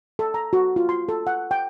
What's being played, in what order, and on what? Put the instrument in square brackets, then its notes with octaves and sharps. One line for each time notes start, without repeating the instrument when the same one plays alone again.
[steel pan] A4
A#5
F#4
F4
C6
A4
F#5
G5